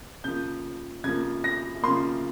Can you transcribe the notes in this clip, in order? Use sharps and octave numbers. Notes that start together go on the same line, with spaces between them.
C#3 F3 A#3 G6
C#3 F3 A#3 G#6
A#6
C#3 F3 A#3 C6